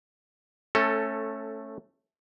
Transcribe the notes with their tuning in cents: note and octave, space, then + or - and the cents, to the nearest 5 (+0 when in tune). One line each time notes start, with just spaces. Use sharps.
A3 +0 C#4 -15 A4 +15